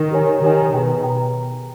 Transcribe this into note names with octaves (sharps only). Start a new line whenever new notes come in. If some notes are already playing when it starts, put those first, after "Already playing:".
Already playing: D#3
G4 A#4 C#5 G#5
D#3 G4 A#4 C#5 G#5
B2 G#4 B4 G5 A#5
G#4 B4 G5 A#5